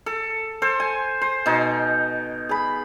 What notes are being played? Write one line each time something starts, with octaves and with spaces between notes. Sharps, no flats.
A4
A4 C5
G#5
C5
B2 D#4
G#4 B5